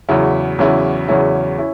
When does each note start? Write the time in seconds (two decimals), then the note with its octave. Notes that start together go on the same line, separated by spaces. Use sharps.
0.09 E2 C#3 F#3 C#4 E4
0.59 E2 C#3 F#3 C#4 E4
1.08 E2 C#3 F#3 C#4 E4
1.58 C#4 E4